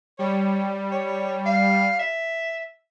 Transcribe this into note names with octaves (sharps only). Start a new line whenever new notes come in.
G3 C#5
C#5
F5
E5